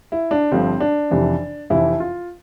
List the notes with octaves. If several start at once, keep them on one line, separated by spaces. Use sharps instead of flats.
E4
D4
G1 G2 D3 F3 C4
D4
F1 F2 C3 E3
F1 F2 C3 E3 E4
F4